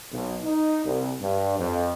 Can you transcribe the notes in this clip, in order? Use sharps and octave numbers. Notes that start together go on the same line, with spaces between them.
B1
D#4
C2
G2
F2